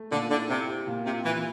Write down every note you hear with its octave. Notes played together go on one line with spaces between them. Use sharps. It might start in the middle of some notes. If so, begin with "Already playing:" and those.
Already playing: A3
A#2 D3
D3 E4
C3 E4
G4
A#2
C3 F4
A#2 E3